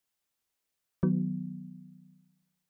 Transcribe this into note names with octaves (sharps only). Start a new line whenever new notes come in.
D#3 F#3 B3